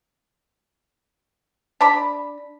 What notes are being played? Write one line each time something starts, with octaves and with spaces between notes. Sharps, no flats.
D4 B5